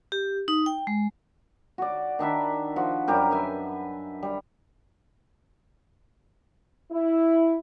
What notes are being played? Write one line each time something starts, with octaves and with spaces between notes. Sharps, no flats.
G4
D#4
G5
G#3
F#4 D5
D#3 D4 E5 B5
F3 F#4
F#2 G3 G4 A#4
B4 E5 G#5
G3
E4